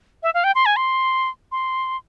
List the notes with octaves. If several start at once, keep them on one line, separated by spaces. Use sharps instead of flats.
E5
F5
G5
C6
G#5
C6
C6